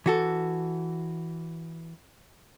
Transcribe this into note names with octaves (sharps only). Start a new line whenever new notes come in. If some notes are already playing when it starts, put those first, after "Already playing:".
E3 F#4 A4